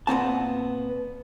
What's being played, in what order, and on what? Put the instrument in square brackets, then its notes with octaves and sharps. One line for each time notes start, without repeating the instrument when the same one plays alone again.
[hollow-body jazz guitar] A#2 B3 C4 A5